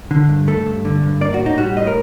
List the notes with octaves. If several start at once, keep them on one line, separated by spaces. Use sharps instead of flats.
D3
G2
A3 A4
G2
D3
G2
A#3 D5
F#4
A2
D#4
G3 F#4
A2 D#5
A#4